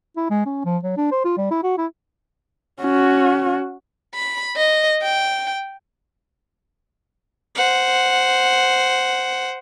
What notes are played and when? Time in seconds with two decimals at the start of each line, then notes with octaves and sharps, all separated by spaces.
0.17 E4
0.30 G#3
0.45 C#4
0.65 F3
0.83 F#3
0.97 D4
1.11 C5
1.25 F4
1.37 G3
1.51 E4
1.63 F#4
1.78 E4
2.81 C#4 F#4
4.14 B5
4.56 D#5
5.02 G5
7.54 C5 F#5